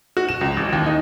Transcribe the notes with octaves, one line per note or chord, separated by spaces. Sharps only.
F#4
E7
C#2
A1
D#2
D#4